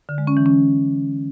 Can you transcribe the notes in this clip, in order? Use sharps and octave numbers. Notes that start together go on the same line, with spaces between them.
D3
G#3
C#4
E3
C#4